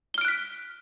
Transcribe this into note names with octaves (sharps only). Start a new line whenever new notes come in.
F6 F#6 B6 D7 G7